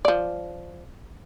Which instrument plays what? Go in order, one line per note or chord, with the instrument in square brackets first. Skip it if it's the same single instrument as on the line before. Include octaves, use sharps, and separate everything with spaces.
[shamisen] F3 D5